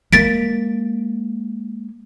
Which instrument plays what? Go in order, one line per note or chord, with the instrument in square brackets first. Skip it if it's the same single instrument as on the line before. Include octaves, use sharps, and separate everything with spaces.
[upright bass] G#3 A#3 [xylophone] A6 B6 D7